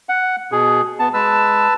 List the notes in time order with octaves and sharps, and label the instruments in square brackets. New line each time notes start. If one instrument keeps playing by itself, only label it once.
[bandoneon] F#5
B2 G#4
B3 A5
[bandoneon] G#3 [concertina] B4 A5 E6